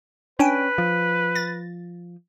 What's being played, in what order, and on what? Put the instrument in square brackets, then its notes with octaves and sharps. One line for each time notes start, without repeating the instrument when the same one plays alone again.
[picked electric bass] C#4 [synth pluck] D4 G5 G#5 [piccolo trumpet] B4
[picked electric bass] F3
[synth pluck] A6 A#6